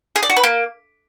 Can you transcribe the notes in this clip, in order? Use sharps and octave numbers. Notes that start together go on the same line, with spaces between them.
G#4
D5
F#4
B4
A#3